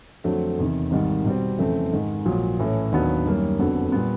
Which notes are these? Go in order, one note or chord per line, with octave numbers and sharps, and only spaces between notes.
F2 D3 F#3 A3 C4
E2 C3 D#3
G#1 G#2 D#3 G3
B2 G3 C4
F2 C#3 E3 A3 C4
G#2 D#3 G#3
A#1 A#2 F#3
A2 E3 A3 C#4
D#2 D#3 F#3 B3 D4
F#2 D#3 G3 A#3 C#4
F1 F2 D3 F#3 B3
A#2 G3 B3